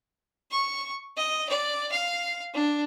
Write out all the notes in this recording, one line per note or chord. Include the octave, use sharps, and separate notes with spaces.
C#6
D#5
D5
F5
D4